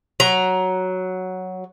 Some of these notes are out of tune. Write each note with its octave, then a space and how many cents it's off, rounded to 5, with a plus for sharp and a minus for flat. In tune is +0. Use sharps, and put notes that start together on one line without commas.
F#3 +0 A#5 +10